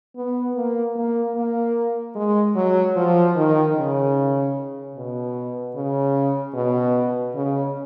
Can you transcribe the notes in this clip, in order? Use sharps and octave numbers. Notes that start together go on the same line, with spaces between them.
B3
A#3
A#3
A#3
G#3
F#3
F3
D#3
C#3
B2
C#3
B2
C#3